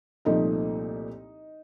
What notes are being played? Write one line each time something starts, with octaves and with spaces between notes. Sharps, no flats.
C2 A#2 F3 A3 D#4 D#5